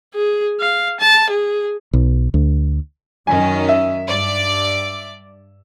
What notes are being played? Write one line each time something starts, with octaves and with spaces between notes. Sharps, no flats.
G#4
F5
A5
G#4
B1
D2
F#2 D#3 C#4 G#5
E5
G2 D5 D6